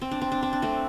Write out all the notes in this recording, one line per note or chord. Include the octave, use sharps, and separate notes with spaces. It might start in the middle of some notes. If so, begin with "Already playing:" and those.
C4
D4
C4
D4
C4
D4
A3 C4